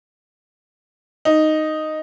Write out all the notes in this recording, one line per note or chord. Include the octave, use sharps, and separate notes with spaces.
D#4